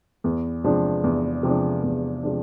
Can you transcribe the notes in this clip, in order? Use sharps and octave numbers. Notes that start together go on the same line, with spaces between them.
E2
C3 F3 G#3 D4
E2
C3 F3 G#3 D4
E2
C3 F3 G#3 D4